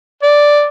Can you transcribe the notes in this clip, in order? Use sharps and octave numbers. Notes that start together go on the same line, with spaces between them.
D5